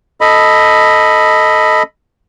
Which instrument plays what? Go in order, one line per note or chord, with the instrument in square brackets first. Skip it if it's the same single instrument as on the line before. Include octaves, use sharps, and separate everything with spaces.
[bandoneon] A4 D#5 B5